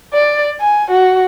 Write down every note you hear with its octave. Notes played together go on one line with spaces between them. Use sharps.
D5
G#5
F#4